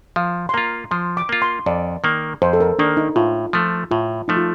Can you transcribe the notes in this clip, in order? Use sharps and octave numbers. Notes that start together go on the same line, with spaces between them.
F3 F5
C6
A#3 F4 A#5
F3 C6
D6
A#3 F4
C6
F2 D5
D#3 A#3
F2 C5
A4
A#4
D#3 A#3 D4
D#4
A2 F4
F3 A3
A2 F4
F3 A3 D#4
F4